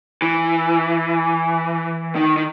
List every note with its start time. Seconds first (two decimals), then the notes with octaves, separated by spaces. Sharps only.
0.22 E3
2.15 D#3
2.37 D#3